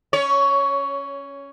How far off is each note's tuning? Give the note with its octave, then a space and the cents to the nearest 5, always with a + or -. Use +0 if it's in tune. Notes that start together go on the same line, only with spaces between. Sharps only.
C#4 +0 C#5 +15